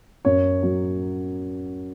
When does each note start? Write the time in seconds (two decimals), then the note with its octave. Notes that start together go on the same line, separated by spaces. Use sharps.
0.25 F#2 C#5
0.63 F#3